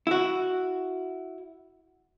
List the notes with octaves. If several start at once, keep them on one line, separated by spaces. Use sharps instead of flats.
E4 F#4